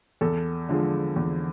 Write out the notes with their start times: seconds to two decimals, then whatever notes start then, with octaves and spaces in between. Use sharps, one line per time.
0.21 E2 A4
0.69 D3 F3 G#3
1.16 E2